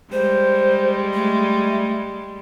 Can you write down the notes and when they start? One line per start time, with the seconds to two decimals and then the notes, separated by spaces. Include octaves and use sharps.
0.12 G3 G#3 C5
1.14 A3